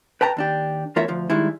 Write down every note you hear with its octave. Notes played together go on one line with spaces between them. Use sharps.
B4 G5 A5 A#5
D#2 D4 G4
E2 A3 F4 A#4 C#5 E5
D2 F3
D#3 G3 G#3 E4